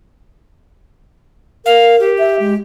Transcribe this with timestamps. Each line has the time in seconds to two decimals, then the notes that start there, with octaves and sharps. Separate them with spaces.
1.66 A#4 F5
2.00 G4
2.18 E5
2.40 G#3